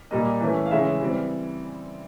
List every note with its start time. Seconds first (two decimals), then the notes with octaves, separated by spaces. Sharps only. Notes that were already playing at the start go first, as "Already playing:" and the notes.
0.11 A#2 G3 A#3 D#5
0.41 E3 A3 C#4
0.66 F5
0.71 C#3 E3 G#3 C#4 E5
1.01 E3 G3 C4